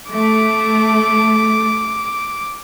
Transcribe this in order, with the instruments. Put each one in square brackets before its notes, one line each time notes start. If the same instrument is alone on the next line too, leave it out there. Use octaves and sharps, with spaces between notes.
[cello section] A3 [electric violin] D6